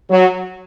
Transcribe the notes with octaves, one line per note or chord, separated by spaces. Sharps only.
F#3